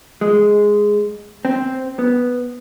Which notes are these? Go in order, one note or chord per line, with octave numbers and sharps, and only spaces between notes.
G#3
C4
B3